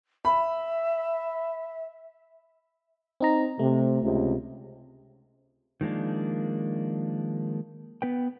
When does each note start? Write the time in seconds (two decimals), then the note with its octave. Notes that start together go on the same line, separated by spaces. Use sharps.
0.25 E5 B5
3.20 C4 D#4 A#5
3.59 C3 A3
4.03 C#2 C3
5.81 D#3 F3 G#3 A#3 D4
8.02 B3 B4 G5